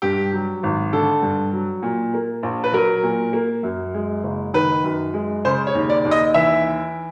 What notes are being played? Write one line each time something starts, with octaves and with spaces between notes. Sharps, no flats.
G2 G4
F#3
G#1
D3 A4
G2
F#3
A#2
A#3
A#1
B4
F#3 A#4
A#2
A#3
F#2
G#3
F#1
D#3 B4
F#2
G#3
C#3 C5
C#5
D#2
D5
D#2
D#5
E3 E5